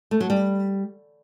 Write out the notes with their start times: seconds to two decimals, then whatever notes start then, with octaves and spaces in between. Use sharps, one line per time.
0.11 A3
0.20 F#3
0.30 G3